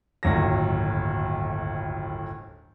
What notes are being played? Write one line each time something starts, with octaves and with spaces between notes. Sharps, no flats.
D1 G1 D#2 F#3 A#6